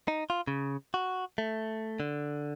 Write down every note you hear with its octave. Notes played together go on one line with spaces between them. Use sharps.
D#4
F4
C#3
F#4
A3
D3